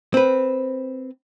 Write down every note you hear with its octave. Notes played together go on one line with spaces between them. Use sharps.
C4 B4